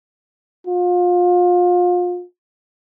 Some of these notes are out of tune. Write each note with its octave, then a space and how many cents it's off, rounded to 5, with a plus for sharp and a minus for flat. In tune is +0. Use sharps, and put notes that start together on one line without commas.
F4 +30